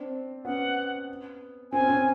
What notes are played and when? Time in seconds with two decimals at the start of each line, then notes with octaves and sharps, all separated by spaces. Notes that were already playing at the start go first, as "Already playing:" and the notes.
Already playing: C4 D4
0.45 B3 C#4 F#5
1.72 C4 G#5
1.80 C#4
1.88 C4
1.96 C#4